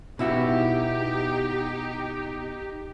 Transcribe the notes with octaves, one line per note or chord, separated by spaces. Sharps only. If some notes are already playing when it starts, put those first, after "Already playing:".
B2 D#4 E4 F#4 G4